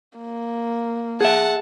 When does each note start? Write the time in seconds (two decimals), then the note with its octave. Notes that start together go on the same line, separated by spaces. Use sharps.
0.18 A#3
1.21 G#4 E5 F#5 A5